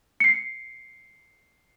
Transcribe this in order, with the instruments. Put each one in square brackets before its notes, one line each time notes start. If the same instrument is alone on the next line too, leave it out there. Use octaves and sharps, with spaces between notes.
[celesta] C7 C#7